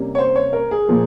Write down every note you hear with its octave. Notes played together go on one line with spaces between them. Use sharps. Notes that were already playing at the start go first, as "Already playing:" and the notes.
Already playing: C3 G3 A#3 C#4
C#5
C5
C#5
A#4
G#4
A#2 F3 A#3